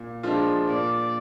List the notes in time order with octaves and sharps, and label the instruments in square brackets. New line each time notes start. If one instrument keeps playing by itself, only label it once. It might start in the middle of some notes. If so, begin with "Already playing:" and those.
Already playing: [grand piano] A#2
F3 G#3 D4 F4
[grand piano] A#2 [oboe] D5